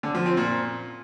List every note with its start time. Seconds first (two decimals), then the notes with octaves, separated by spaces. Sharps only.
0.03 D3
0.15 F3
0.26 C4
0.37 A#2